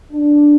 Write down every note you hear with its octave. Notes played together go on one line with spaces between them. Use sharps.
D4